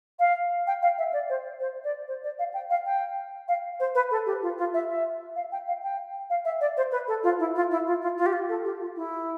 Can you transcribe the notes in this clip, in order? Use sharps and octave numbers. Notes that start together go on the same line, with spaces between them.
F5
G5
F5
E5
D5
C5
C5
D5
C5
D5
F5
G5
F5
G5
F5
C5
B4
A4
G4
F4
F4
E5
E5
F5
G5
F5
G5
F5
E5
D5
C5
B4
A4
F4
E4
F4
E4
F4
F4
F4
G4
F4
A4
G4
F4
E4